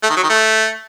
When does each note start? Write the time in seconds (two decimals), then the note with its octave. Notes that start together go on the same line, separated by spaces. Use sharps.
0.03 A3
0.10 D#3
0.16 F#3
0.23 D#3
0.30 A3